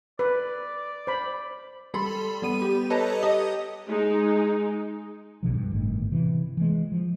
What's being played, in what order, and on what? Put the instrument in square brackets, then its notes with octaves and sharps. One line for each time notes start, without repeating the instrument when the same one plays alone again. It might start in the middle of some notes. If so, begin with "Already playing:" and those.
[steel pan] B4 [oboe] D5
[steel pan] C5 B5
[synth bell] G3 A4 B5 C6
G3 B3 D#7
G4
A4 B4 C#5 D#5 A5 A#5
G4 D#5 D#6
[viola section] G#3 D#4
[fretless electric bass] B1 B2 D3 F3
G2
G1 A2 D#3
C3 E3
E3 G#3
F3